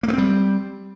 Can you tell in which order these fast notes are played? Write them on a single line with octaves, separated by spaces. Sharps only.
A#3 A3 C4 G3